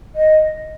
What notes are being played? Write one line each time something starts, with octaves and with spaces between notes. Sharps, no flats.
D#5